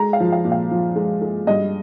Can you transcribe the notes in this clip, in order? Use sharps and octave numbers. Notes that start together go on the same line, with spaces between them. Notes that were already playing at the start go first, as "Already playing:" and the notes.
Already playing: G#3 A#5
F5
F3
F5
A#2
F5
F3
G#3
G#3
G2 D#5